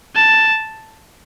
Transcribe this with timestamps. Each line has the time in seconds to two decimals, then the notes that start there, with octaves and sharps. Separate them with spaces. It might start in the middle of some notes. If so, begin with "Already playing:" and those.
0.16 A5